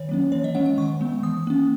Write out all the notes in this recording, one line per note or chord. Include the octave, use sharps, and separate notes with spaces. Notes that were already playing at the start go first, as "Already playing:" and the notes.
Already playing: D#3 C#5
F#3 A#3 C#4
E3 C#5
D#5
G#3 C#4 F#5
F#5
D#3 C#6
G#3 B3
E3 D#6
A#3 C#4